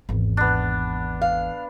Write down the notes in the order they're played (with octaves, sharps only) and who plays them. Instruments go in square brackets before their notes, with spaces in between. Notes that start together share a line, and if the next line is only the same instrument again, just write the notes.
[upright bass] G#1 E2
[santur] B3 D4
[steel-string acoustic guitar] F5